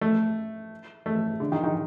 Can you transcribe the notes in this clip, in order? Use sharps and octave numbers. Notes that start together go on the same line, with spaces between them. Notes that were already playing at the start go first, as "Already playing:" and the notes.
A3
A3
D3
D#3
D#3